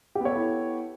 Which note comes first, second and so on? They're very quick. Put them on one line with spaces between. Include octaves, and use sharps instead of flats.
G4 B3 C#5 A4 E4